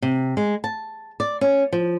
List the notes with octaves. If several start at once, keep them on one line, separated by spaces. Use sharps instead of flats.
C3
G#3
A5
D5
C#4
F3